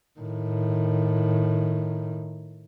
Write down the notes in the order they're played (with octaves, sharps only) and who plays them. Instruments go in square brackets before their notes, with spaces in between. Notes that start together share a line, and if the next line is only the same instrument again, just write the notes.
[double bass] A2 D#3